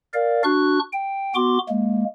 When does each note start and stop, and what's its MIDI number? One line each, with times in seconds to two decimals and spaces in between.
0.14 0.43 70
0.14 0.43 74
0.14 0.43 77
0.44 0.79 62
0.44 0.79 66
0.44 0.79 85
0.44 0.79 90
0.93 1.34 79
1.35 1.58 59
1.35 1.58 66
1.35 1.58 84
1.35 1.58 86
1.69 2.04 56
1.69 2.04 58